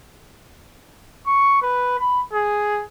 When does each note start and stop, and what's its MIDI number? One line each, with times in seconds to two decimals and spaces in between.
1.27 1.57 85
1.62 1.98 71
1.99 2.21 83
2.33 2.83 68